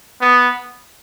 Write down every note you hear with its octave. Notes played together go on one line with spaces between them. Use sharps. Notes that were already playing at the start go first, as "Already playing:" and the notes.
B3